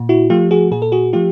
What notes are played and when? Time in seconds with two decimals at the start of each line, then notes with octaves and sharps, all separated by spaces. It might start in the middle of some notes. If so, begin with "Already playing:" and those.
Already playing: A#2
0.09 E4 F#4
0.30 F3 A3 F4 G4
0.51 F#4 G#4
0.71 A#2 G#4
0.82 A4
0.92 F#4 G#4
1.13 F3 A3 F4 G4